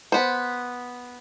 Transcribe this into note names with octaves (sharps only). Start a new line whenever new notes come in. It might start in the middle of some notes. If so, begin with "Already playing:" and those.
B3 C5